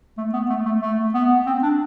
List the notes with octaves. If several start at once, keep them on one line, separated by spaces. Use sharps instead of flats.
A3
B3
A3
A3
A3
B3
C4
D4